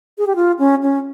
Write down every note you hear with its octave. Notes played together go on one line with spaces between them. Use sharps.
G#4
G4
F4
C#4
C#4